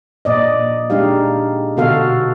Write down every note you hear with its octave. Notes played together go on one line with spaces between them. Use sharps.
A#2 D5 D#5
A#2 G#3 D4 D#4 G4 F5
B2 D3 F#4 A4 F5